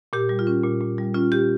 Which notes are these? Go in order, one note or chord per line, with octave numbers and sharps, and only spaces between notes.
A#2 G4
G3
F4
C#4
A#2
A#2
G3
C#4 F4
A#2 G4